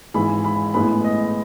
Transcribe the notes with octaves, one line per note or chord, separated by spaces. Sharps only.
G#1 G#2 E3 G#3 B5
B5
A1 A2 G#3 B3 B5
D#5